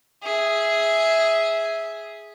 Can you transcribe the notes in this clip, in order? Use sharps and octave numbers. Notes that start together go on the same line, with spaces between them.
G#4 E5